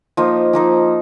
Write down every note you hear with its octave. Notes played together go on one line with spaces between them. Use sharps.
F3 A#3 D#4
F3 A#3 D#4